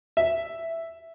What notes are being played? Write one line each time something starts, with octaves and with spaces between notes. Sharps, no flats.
E5